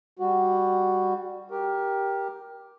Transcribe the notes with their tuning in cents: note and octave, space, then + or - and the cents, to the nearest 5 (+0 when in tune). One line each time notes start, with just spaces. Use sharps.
G3 +10 F#4 +0
G4 +0 A#4 +15